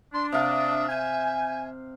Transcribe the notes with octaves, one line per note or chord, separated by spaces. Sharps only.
D4 C6
C3 E5 F5 D#6
G#5 G6